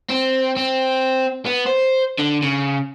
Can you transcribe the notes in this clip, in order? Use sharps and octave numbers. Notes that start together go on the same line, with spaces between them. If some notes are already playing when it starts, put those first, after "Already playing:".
C4
C4
B3
C5
D3
C#3